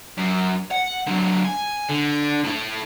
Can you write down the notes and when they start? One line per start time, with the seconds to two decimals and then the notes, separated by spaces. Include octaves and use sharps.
0.18 F#2
0.71 F#5
1.07 D3 F#3
1.45 G#5
1.89 D3
2.44 A2 E4